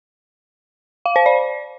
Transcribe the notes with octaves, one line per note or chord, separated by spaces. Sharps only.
F5
C5
D5